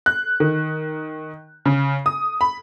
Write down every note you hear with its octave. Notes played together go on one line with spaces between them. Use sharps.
F#6
D#3
C#3
D#6
B5